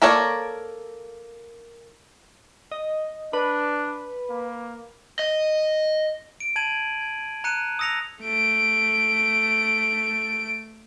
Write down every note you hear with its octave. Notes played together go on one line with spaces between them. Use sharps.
A#3 A4 A#4 C#5 D5
D#5
D4 B4
A#3
D#5
D7
A5 G#6 D#7 F#7
G#6
A#5 F#6 C#7 D#7
D#6 E6 A#6 C#7 F7
A3 D7